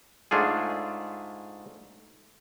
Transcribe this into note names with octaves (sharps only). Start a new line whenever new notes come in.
G#2 A3 D4 F4 G#4